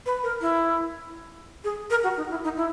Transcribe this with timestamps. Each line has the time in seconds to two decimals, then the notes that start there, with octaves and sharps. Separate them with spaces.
0.06 B4
0.23 A#4
0.41 E4
1.64 G#4
1.90 A#4
2.04 F#4
2.17 D#4
2.30 E4
2.44 D#4
2.57 E4